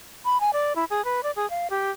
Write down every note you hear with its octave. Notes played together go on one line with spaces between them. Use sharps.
B5
G#5
D5
E4
G#4
B4
D5
G#4
F5
G4